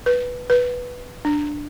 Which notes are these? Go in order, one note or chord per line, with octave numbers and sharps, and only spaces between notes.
B4
B4
D4